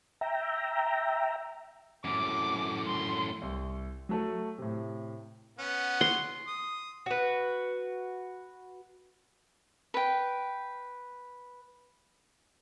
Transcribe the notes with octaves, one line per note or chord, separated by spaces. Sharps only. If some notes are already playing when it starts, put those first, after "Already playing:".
E5 G5 A#5
F#2 A2 D6
C6
C2
F#3 A3 A4
A2 C3
B3 C#4 F#5
C6
D#6
F#4 B4
B4 G5